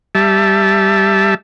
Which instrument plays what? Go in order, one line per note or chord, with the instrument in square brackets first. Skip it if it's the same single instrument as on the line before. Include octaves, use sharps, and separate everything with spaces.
[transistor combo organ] G3 E5 A5